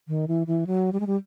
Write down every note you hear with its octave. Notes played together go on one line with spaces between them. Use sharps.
D#3
E3
E3
F#3
G3
G#3
G3